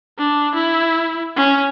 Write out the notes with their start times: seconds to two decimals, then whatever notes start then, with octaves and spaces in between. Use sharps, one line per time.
0.19 D4
0.55 E4
1.37 C#4